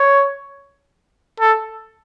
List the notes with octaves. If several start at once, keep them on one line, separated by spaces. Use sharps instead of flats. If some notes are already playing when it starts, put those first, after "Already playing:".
Already playing: C#5
A4